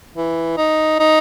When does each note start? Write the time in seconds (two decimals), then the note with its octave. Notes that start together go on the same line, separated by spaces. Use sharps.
0.15 E3
0.57 D#4
0.99 D#4